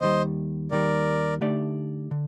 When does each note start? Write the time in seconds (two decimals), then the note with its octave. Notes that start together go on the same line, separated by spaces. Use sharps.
0.01 D#2 D#3 G3 C5 D#5
0.71 D#2 D#3 G3 A#4 D5
1.41 D3 A3 D#4 G4 D5
2.11 D3